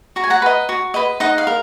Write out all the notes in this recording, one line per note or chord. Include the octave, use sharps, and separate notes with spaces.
F#4 A#5
G#5
F#5 A#5
B4 D#5
F#4
B4 D#5
D#4 D#5 F#5
F5
A#4